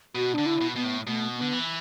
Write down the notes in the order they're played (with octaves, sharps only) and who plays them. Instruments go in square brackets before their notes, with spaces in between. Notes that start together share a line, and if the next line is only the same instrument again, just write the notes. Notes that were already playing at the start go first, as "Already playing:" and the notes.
[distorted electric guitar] B2 [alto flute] F#4
[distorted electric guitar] D3 [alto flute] D4
[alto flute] E4
[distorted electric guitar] B2
[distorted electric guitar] B2 [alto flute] B3
[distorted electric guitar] A2
[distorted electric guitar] B2 [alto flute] A3
[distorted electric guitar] D3 [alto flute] B3
[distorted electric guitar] E3